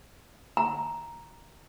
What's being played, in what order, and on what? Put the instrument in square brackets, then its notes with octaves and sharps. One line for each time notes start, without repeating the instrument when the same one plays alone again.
[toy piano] A#5